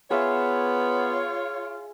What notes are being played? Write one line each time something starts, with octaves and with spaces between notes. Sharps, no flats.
B3 F4 G#4 C#5 E5 C#6